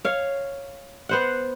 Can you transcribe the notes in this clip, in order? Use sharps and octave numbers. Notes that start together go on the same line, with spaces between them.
C#5 F5
B3 C5 F#5